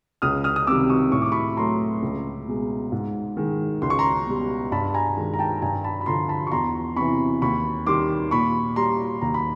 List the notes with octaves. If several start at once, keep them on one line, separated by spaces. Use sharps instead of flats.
C#2 D#6 F6
D#6 F6
D#6
C3 D#3 G3 D6 E6
C#6 D#6
A2 C#6
D6
B5 C#6
F#3 A3 A#5 C6
C#2
B2 G#3
G#2
D#3 G#3
C#2 C6
C#6
A#5 C6
B2 G3
G2 A5 B5
G#5 A#5
D#3 G#3
A#5
G5 A5
G2 G#5 A#5
A5 B5
B5
D3 F3 A#5 C6
A5 B5
C#6
E2 A#5 C6
C3 E3 B5 C#6
D#2 B5 C#6
D#3 G3 C6 D6
A#2 B5 C#6
G3 A#5 C6
D#2 A#5
B5